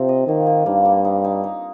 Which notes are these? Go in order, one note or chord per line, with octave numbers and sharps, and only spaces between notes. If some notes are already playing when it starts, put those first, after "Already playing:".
Already playing: C3 F3 C4 D#4 F4
D#5
D#3 A#3
A#3
G2 A#3
A#3
D#4
D#4
D#4